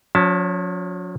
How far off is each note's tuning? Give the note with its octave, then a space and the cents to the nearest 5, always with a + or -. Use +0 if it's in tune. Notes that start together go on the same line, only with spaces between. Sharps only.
F#3 -45 C#4 +25 A5 +0